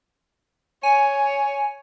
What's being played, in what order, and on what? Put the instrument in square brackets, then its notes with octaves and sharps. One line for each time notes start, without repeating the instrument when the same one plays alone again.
[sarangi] C#5 [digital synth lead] G#5